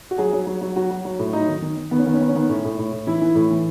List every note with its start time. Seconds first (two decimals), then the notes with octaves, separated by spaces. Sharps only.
0.11 F#4
0.18 F#3 G#4
0.33 F#3
0.47 F#3
0.61 F#3
0.76 F#3 F#4
0.91 F#3
1.05 F#3
1.19 A2
1.33 F#3 D#4
1.48 D#3
1.62 D#3
1.77 D#3
1.91 D#3 B3
1.98 C#4
2.06 D#3 B3
2.14 C#4
2.20 D#3 B3
2.28 C#4
2.35 D#3 B3
2.49 A2 C#4
2.64 A2
2.78 A2
2.92 A2
3.07 E3 E4
3.22 E3
3.35 A2
3.51 E3